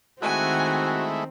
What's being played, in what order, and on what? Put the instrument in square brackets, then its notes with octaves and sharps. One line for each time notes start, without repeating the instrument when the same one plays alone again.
[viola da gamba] D#3 C4 [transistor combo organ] G#3 A3 E4 [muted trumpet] F#4 [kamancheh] F#5 G#5